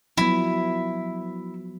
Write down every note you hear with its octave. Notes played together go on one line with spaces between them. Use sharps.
F3 F#3 B3 E4